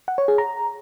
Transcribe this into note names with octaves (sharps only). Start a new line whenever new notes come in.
F#5
C#5
G#4
A#5